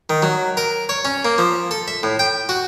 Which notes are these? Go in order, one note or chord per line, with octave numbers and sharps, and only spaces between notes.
D#3
F#3
A#4
C#5
C#4
A#3
F3
A4
E5
A2
G5
F#4